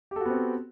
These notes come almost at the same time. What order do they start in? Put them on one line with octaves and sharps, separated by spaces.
G4 A4 F#4 B3 C4